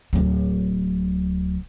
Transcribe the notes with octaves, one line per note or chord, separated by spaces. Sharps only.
D1 F#3